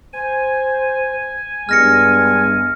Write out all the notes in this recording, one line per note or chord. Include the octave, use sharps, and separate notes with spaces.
C5 G#5
G2 G#3 B3 F6 A#6 C#7